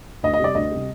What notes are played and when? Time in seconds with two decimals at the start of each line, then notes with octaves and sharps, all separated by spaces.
0.23 D2 D#5
0.34 D#5
0.39 C3 G3 D5
0.55 D2 D#5
0.71 C3 G3